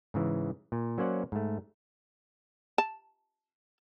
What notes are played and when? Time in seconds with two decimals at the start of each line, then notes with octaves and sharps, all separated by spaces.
0.14 G#2 C#3 E3
0.72 A#2
0.98 F#3 A#3 C#4 C5 D5 F#5
1.32 G#2 A3
2.78 A5